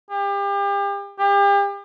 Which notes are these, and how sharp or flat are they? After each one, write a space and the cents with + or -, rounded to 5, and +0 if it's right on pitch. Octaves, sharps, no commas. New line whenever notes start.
G4 +35
G4 +40